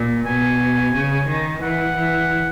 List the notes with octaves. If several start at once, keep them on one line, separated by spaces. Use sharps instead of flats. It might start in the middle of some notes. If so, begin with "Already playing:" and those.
Already playing: A#2
B2 G#5
C#3
D#3
E3 F#5
E3